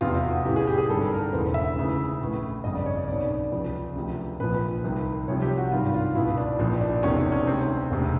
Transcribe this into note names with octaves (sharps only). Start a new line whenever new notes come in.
F1 E2 C3 E3 F4
F#4
A1 A2 E3 G4
G#4
G4
G#4
G#1 G2 D3 A4
A#4
E1 D2 C#3 E3 C5
E5
D2 C#3 E3
A#1 A2 E3
G1 F2 C#3 D#5
D5
C#5
D5
B1 B2 D5
D5
C#2 C3 F3
D2 C3 F3
A#1 A#2 F3 B4
C2 C3 D#3
C2 C3 F3 C#5
G4
F#4
G#1 G2 D#3 F4
F4
C#2 B2 E4
D4
A#1 A#2 F3 D4
D4
E1 E2 C3 D#3 C#4
D4
C#4
D2 C3 D#3 C4
E1 D2 C3